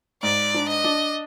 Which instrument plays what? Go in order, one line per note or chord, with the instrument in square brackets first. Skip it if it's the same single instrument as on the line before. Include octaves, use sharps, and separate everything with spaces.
[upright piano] G#2 [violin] D5
[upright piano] D4
[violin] D#5
[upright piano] D4